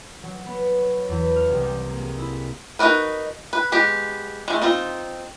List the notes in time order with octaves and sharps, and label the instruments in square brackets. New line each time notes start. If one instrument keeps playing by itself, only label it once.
[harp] F#3
B3
C#5
E2
F6
C2
G3
A#3
G#4
E4
[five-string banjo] D#4 F4 F#4 A#4 B4
B4
G#3 B3 G4
G#3 A3
C4 D#4 F4